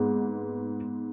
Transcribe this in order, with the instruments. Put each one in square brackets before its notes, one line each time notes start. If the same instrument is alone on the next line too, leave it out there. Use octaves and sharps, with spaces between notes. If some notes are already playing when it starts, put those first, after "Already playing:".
Already playing: [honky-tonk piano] G#2 G#3 B3